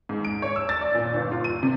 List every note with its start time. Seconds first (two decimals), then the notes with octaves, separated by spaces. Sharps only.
0.09 G#2
0.25 D7
0.42 C#5
0.56 E6
0.69 A6
0.81 D5
0.94 A#2
1.14 G1
1.32 F4
1.44 D#7
1.63 C3